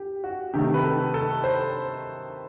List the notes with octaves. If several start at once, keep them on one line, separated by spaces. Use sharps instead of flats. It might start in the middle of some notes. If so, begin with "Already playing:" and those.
Already playing: G4
F#4
C3 D#3 A3 G4
B4
A4
A4
C5